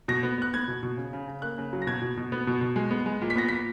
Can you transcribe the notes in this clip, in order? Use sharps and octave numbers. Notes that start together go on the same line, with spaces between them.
B2 A#6
B3
B3 F#6
B3 G#6
B2
B2
C#3
C#3
C#3
A#3 F#6
C#3
F#3
A#6
B2 G#6
B2
B2
B3
B2
B2
G#3
B3
G#3
A#2
B6
B3 A#6
A#2 B6